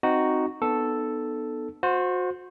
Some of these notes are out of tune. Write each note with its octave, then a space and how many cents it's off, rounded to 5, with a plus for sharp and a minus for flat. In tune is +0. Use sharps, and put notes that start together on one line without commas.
C4 +0 D#4 +0 F#4 +0
B3 +0 D#4 -40 A4 +0
F#4 -30 C5 +0